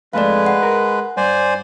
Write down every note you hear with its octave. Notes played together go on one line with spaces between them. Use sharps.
F2 G#2 G#3 A3 B4 D5 F5
F#5
A#4
G2 C5 D5 G#5